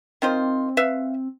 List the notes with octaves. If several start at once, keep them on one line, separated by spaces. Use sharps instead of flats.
D#3 C4 F4 C5
B4 E5 F5